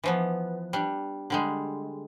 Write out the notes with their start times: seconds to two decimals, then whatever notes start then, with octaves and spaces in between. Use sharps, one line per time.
0.04 E3 F3 B3
0.73 G3 D4
1.30 D3 G3 G#3